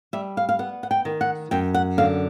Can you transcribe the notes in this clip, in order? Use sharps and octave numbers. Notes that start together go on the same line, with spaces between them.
G3 E5
F5
F5
B3 F#5
F#5
G5
D#3
F#5
F#2 G5
F#5
D3 F5